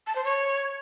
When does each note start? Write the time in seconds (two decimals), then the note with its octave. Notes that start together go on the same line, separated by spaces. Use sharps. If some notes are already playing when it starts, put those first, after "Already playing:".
0.07 A5
0.16 C5
0.24 C#5